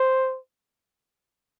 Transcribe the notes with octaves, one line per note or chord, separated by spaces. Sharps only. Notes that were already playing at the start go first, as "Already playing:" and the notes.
Already playing: C5